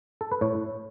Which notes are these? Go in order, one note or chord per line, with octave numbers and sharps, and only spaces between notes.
A4
B4
A2 C#5